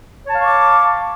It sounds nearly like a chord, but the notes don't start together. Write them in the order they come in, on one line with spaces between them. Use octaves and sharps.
C#5 A5 F5 C#6 D6